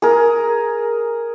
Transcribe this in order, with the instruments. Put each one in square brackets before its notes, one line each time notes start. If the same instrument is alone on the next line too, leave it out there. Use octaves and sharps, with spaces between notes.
[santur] G#4 A#4